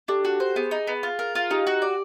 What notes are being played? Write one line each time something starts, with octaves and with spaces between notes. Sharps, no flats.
D4 G4 A4
F#4
C5
B3 G#4
D#4
B3
F4
A#4
F4
D#4 G4
F#4
D5